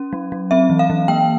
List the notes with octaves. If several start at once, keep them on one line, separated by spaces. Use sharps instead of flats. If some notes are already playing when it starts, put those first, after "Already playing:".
Already playing: C#4
F#3
F#3
C4 E5
E3
F5
E3
A#3 G5